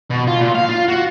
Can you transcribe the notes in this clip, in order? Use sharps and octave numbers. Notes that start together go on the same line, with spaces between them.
B2
F4
A#2
F5
F4
F#4